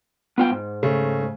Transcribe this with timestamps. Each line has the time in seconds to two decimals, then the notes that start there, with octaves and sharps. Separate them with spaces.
0.38 B3 F4 G5
0.51 G#2
0.83 C#3 A3